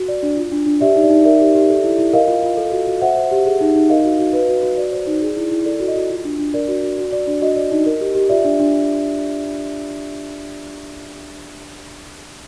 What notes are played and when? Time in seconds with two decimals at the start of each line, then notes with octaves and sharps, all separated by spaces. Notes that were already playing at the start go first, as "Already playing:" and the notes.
Already playing: F#4
0.08 D5
0.23 D4
0.37 F4
0.52 D4
0.66 D4
0.81 G4 D5 E5
0.96 D#4
1.03 D5
1.10 D#4
1.25 A#4 D5 E5
1.40 G4
1.55 G4
1.69 A4
1.84 E4
1.98 E4
2.13 A#4 D#5 F5
2.28 F4
2.43 F4
2.57 A4
2.71 F#4
2.87 F#4
3.02 C5 E5 F#5
3.16 C5
3.31 G4
3.45 G#4
3.61 D#4
3.75 D#4
3.89 A#4 D#5 F5
4.04 F#4
4.19 F#4
4.33 B4
4.48 F#4
4.63 F#4
4.77 F#4 D5
4.92 C5
5.07 D#4
5.22 G#4
5.37 E4
5.52 E4
5.65 A4 D5
5.80 F#4
5.88 D#5
5.96 F#4
6.10 F4
6.25 D4
6.39 D4
6.54 A#4 D5
6.68 F#4
6.83 F#4
6.98 F#4
7.12 D5
7.27 D4
7.42 F#4 D#5
7.56 D5
7.71 D#4
7.86 A#4
8.00 G4
8.15 G4
8.29 F4 D5 E5
8.44 D4
8.59 D4